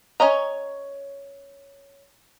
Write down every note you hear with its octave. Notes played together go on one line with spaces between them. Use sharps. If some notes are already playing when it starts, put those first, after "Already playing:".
C#4 C#5 D#5 A#5